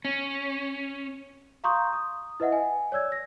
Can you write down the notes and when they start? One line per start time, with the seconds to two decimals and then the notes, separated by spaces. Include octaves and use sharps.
0.05 C#4
1.64 F5 A#5 C6 C#6 D#6 G6
1.93 D#6
2.40 E4 B4 D#5 E5 F#5
2.52 G#5
2.92 C#5 D5 E6 G#6
3.12 A#6